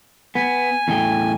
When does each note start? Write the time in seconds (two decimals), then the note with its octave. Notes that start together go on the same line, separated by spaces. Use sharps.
0.35 B3 G#5
0.88 E2 A2 G5